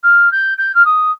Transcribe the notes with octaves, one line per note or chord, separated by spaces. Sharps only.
F6
G6
G6
F6
D#6